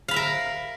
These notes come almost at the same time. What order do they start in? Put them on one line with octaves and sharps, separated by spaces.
F5 B5 E5 A#4